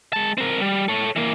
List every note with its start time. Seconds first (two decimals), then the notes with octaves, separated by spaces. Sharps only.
0.13 G#3 A5
0.38 C4 A#4
0.61 G3
0.88 A4 C#5
1.16 E3 A#3